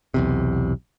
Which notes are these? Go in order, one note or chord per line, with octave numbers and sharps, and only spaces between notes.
B1 E2 C3